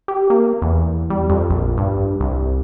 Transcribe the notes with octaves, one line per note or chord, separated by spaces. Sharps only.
G4
A#3
E2
G3
F2
A#1
G2
C2